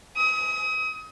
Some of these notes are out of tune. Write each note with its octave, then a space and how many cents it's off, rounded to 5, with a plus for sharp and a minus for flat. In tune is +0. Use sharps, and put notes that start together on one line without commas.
D#6 +35